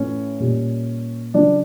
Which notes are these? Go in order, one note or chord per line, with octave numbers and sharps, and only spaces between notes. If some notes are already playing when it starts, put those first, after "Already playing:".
Already playing: A2 E3 C#4 C#5
A#2 G3
C#3 F#3 D4 D5